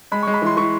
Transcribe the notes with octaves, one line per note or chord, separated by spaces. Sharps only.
G#3 B5
G#3 C#6
B5
E3 C6
E3 C#6